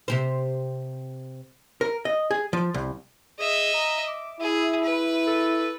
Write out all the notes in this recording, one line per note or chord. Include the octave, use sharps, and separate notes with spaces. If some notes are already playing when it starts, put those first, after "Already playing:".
C3 G4 C5
A#4
D#5
G#4
F3
C2
G#4 D#5 E5
A#5
D6
E4 G#4 E5
B4
A4